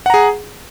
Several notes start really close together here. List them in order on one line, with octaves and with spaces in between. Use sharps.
F#5 A#5 G#4